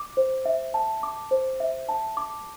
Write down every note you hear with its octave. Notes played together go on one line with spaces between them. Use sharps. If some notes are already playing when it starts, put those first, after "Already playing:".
Already playing: D6
C5
E5
A5
D6
C5
E5
A5
D6